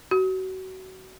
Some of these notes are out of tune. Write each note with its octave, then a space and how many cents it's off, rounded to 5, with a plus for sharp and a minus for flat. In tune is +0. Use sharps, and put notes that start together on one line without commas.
F#4 +25